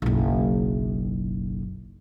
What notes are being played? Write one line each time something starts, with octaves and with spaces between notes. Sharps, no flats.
F#1 B1